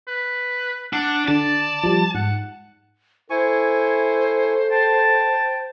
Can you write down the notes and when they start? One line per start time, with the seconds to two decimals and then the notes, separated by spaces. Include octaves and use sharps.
0.08 B4
0.93 D4 F#5
1.28 D3 D5 A5
1.83 F3 G3
2.15 G#2 F#5
3.30 E4 A4 C5 G#5 C#6
4.71 G5 A5